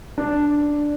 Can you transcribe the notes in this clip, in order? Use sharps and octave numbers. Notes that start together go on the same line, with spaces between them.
D4